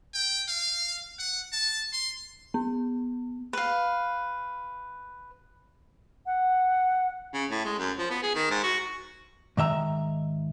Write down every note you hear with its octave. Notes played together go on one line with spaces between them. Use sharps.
G5
F5
F#5
A5
C6
B3
B4 F5
F#5
C#3
A2
G#3
F#2
F3
B3
G#4
D#3
G#2
F#4
G#2 D#3 E5 A#5